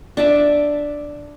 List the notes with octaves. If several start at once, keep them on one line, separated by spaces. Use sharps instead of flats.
D4 D5 E5